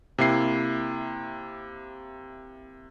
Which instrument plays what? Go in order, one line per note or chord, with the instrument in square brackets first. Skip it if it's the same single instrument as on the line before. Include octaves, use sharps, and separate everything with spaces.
[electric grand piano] C3 A#3 E4 C7